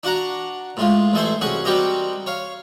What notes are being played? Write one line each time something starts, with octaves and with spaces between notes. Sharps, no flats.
D4 F#4 F#5 A#5
A2 G#3 F4
A1 A3 G#4 A4 C5
C2 C#4 F#4 G#4
G3 C4 F#4 G4 A#4 D#5
C#5 F5